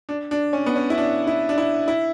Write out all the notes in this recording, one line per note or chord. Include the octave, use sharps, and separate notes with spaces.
D4
D4
C#4
B3
C#4
E4
D4
E4
D4
E4
E4